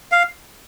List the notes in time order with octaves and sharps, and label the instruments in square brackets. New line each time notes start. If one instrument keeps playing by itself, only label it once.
[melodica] F5